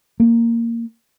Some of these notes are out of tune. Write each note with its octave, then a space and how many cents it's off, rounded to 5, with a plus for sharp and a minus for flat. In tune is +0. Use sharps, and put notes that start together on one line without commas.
A#3 -10